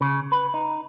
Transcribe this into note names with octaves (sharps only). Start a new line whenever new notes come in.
C#3
B4
D#4